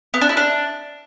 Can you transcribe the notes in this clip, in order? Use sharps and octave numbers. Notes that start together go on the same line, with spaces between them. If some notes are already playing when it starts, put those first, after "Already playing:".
B3
D4
E4
D4